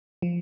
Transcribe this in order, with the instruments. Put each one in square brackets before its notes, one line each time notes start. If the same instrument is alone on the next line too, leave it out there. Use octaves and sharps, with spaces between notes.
[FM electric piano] F3